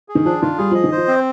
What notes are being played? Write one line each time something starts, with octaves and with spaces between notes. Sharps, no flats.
G#4
D#3
F3 D4
D#3 F4
G3 G#4
F3 D#5
D#3
F3 C5
C4